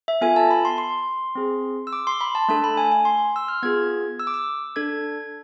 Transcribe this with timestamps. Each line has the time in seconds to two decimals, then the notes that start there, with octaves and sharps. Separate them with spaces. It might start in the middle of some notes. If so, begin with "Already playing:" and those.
0.08 E5
0.21 B3 F4 A4 G#5
0.36 A5
0.51 B5
0.65 C6
0.78 C6
1.35 C4 G#4
1.87 E6
1.93 D6
2.07 C6
2.21 B5
2.35 A5
2.48 A3 D4 A4 A5
2.64 B5
2.77 G#5
2.92 G#5
3.05 C6
3.36 E6
3.48 F6
3.62 B3 F4 G#4 G#6
4.19 E6
4.27 D6
4.34 E6
4.76 D4 A4 G#6